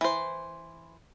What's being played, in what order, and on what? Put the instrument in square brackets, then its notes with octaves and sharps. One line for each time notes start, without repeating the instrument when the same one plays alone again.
[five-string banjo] E3 C5